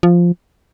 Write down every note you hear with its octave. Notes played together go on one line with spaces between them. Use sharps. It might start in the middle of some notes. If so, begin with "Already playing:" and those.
F3